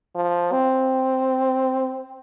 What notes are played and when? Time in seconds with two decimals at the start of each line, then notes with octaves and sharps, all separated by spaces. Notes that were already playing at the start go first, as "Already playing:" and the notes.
0.15 F3
0.52 C4